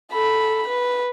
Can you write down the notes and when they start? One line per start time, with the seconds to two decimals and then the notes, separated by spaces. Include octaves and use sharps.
0.12 A4 B5
0.68 B4